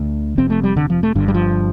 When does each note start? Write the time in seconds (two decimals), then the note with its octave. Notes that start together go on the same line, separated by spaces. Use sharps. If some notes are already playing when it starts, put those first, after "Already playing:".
Already playing: D2 D3
0.37 F1 F2 C3 C4
0.50 A3
0.63 G3
0.77 D3
0.90 F3
1.03 A3
1.15 G1 G2 D3
1.28 G3
1.34 F3